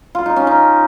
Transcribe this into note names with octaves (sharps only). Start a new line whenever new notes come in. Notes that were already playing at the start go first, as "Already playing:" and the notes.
F4
D#4
C#4
D#4